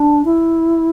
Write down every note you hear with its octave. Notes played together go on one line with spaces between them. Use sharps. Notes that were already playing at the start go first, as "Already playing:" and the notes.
Already playing: D4
E4